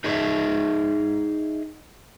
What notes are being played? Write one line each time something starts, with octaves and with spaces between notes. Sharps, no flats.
D#4 G#4 C5 C#5 D#5 E5